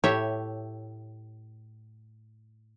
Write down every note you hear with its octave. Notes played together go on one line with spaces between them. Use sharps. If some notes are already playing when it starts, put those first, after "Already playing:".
A2 G4 C#5 E5